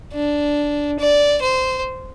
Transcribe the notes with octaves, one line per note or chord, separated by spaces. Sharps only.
D4
D5
C5